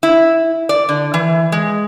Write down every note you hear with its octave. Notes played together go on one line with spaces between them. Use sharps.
E4
D5
D3
E3
G#3